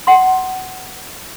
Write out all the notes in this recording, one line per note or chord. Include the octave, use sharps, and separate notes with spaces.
F#5 C6